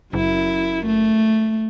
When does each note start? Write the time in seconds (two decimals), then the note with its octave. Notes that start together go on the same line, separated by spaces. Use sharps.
0.13 F#1 F#2 E4
0.86 A3